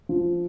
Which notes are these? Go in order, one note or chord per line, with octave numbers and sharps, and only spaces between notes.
F3